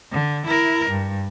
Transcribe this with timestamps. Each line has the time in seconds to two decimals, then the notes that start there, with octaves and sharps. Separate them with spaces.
0.13 D3
0.46 E4 A#4
0.90 G2